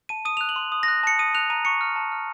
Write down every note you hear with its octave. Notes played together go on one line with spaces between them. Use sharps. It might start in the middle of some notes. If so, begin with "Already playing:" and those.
A5 D#7
D#6 D#7
F#6 F7
F#7
C6
D#6
A#6
F#6
A5 C#7
D#6 D#7
F#6 F7
A#5 D#7
C#6 C#7
F6
A5
F6